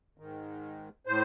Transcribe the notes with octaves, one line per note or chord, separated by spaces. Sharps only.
G#2 D#3
A2 C5